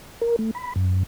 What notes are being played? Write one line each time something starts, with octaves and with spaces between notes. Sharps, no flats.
A#4
A3
B5
F#2